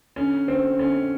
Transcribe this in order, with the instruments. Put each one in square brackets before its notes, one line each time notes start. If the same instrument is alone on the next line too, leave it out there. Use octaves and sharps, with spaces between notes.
[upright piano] D3 C#4
D3 C4
D3 C#4